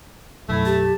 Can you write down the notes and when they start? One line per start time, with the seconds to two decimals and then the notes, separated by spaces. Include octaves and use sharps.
0.49 B1 F#2 A3 E4
0.66 G4 A5